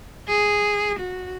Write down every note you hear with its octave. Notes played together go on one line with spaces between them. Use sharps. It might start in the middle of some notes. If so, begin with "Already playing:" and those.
G#4
F#4